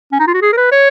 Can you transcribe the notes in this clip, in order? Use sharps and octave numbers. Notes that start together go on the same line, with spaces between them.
C#4
D#4
F4
F#4
G#4
A#4
B4
C#5